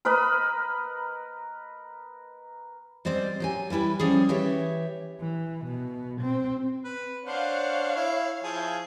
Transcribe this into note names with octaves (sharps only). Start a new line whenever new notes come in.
A#4 B4 D#5 B5
G3 G#3 C4 C5 D5
F#3 G4 G#5
E3 G3 E4 G4 B4
F3 G3 C#4 G#4
E3 G4 C#5 E5
E3
B2
C4
B4
D4 C5 C#5 F5 F#5
E4
F3 E4 G#4